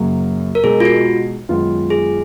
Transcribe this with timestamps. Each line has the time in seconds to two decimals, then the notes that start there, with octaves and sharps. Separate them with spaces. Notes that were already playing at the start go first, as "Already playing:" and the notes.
Already playing: F#2 C#3 F#3 A#3
0.55 A#4
0.63 B2 G#3 D#4 G#4
0.80 F4
0.85 F#4
1.49 F#2 D#3 G#3 B3 F4
1.90 G#4